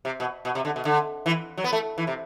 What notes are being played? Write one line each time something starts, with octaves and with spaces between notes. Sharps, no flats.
C3
B2
B2
C3
D3
B2
D3
E3
F#3
B3
A3
E3
C3